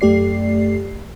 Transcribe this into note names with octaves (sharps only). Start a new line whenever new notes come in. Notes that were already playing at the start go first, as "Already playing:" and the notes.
F#2 A3 G4 D5 C7